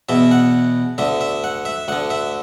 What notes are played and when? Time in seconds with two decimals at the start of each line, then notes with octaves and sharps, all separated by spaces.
0.09 E2 B2 E5
0.31 F#5
0.98 D2 D3 E5
1.21 E5
1.44 F#5
1.65 E5
1.88 D2 D3 F#5
2.10 E5